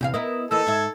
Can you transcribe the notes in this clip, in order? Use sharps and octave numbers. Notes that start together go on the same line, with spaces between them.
E2 C3 G4 F5
B3 E4 A#4 D#5
E3 A#3 D#4 A4 E6
G#2 E5 G#6